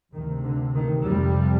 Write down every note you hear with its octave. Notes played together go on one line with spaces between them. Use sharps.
D2 C3 D#3
D3
D#3
F2 C3 G3